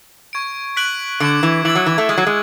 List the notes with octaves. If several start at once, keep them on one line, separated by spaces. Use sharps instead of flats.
C#6 G#6 D7
F#6 B6 D7 F#7
D3 D6 G#6 D7
E3
E3 E6 A6 D7 F#7
F#3
E3
A3
G#3 C#6 G#6 B6
F#3
G#3